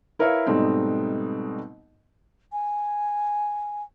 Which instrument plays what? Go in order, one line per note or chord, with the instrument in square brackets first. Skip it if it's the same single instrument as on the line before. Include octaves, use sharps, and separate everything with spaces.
[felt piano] E4 A#4 B4 C#5 E5 F5
G#2 B2 G3 A3 C4 D#4
[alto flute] G#5